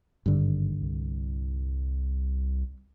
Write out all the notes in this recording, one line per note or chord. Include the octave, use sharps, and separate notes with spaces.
G#1 G2 D3
C2